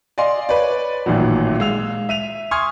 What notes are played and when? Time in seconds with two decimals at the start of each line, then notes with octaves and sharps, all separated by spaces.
0.18 D5 D#5 F5 G#5 C6
0.49 B4 C#5 D5
1.06 A1 A#2 D#3 F#3
1.60 G#3 F5 E6 F7
2.09 E5 D#7 F7
2.51 G#5 C6 C#6 D#6 F6 G#6